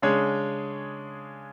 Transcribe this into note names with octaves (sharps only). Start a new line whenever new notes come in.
C#3 G#3 D4 G#4 C#5